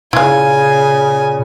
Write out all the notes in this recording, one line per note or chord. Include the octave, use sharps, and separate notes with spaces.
A#2 C#3 E4 F5 G#5